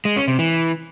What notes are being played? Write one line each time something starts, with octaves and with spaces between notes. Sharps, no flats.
G#3
C#4
C3
E3